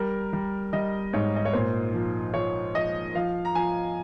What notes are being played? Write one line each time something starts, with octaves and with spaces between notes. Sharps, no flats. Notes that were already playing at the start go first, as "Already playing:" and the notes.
Already playing: G3 A#4
G3
G3 D#5
G#2 C#5
D#5
C#5
A#2 C5
F3
F3 C#5
F3 D#5
F3 F5
A#5
F3 G#5